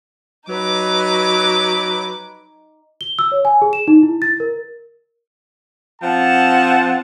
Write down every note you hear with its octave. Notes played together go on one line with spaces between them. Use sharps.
F#3 D#4 B4 D6
G7
E6
C#5
G#5
G#4
E7
D#4
E4
A6
A#4
F3 C4 F#5 A5